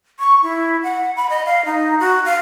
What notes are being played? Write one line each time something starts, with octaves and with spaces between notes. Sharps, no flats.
C#6
E4
F#5
B5
D#5
F5
D#4
F#4
F5